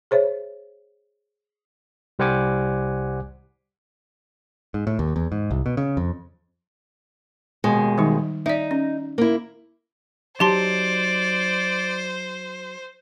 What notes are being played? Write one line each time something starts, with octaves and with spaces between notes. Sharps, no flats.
G#4 C5 C#5 E5
C2 G3 C5 F#5 G#5 D6
G#2
A2
D#2
E2
G#2
C2
B2
C#3
F2
D#2 B2 G#3
D#3 G3 D#4
D#4 D5 E5
C#4
A#3 E4
F#3 D#4 G4 C5 D5 A5 C6